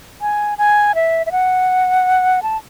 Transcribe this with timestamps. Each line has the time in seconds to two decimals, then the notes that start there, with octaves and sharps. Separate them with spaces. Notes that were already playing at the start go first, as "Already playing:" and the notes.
0.21 G#5
0.58 G#5
0.95 E5
1.26 E5
1.32 F#5
2.43 A5